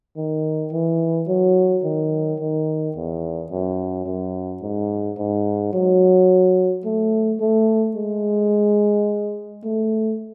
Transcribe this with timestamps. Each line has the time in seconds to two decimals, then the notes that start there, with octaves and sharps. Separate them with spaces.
0.17 D#3
0.72 E3
1.28 F#3
1.83 D#3
2.40 D#3
2.95 E2
3.50 F#2
4.06 F#2
4.62 G#2
5.18 G#2
5.73 F#3
6.85 A3
7.40 A3
7.96 G#3
9.64 A3